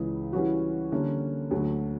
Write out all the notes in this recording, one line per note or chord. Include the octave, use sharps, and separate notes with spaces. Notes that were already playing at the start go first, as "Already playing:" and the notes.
Already playing: C#2 C#3 E3
E3 G3 C#4 F#4
D3 G3 A#3 C#4
D2 D3 F#3